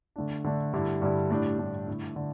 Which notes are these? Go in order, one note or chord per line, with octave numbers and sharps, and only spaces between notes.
D3 A3 D4
D3 A3 D4
G2 D3 G3 E4
G2 D3 G3 E4
A2 G3 D4
A2 G3 D4
D3 A3 E4
D3